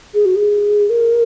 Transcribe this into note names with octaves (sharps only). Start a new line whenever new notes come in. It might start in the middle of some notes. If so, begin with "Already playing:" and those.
G#4
F#4
G#4
A#4